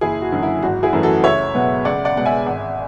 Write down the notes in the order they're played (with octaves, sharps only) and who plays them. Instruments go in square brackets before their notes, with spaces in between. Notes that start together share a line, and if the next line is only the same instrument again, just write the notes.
[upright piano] F#1 E4 G#4
F#4
F#2 D3 F#3
E4
G#1 F#4
E4 G#4
F#2 E3 A3
F#4 A4
C#2 C#5 E5
B2 F#3 B3
C#2 D5 F#5
D5 F#5
B2 G#3 B3 F#5
E5 G#5
G#1